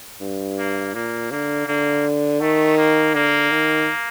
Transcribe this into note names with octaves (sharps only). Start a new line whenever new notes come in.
G2
A#3
A#2 A#3
D3 A#3
D3 A#3
D#3 A3
A#3
D3 A#3
D#3